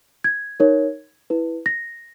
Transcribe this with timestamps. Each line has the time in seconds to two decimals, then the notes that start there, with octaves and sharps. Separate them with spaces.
0.24 G#6
0.60 D#4 A#4 C#5
1.30 E4 B4
1.66 A#6